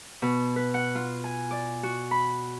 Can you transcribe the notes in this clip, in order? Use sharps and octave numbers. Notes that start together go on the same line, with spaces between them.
B2
B4
F#5
F4
G#5
D5
F#4
B5